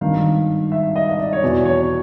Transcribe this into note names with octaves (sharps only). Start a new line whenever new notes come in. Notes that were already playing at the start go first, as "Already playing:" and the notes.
G#1 G2 D#3 F5
E5
D#5
D#5
D5
C#5
E2 B2 D5
C#5
C#5